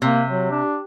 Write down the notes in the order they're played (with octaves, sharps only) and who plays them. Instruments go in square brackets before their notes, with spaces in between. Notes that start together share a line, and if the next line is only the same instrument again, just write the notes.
[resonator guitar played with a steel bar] C3 [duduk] A#3
[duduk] F#3
D4